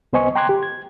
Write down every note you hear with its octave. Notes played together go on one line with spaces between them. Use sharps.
C2 B3 C5 D#5 G#5 C#6
G5 A#5 C6 D6 F#6 G#6
G4
G#6